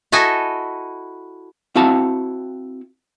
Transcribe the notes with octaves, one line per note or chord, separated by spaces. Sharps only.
E4 F#4 A4 D#5 G#5
C4 E4 F#4 F5 A5